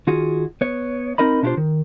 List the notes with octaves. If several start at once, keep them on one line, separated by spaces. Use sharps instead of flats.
D#3 F4 F#4 G#4
B3 C#5
C4 D#4 A#4 D#5 B5
B2 D4 E4 F4 G4 C5
D#3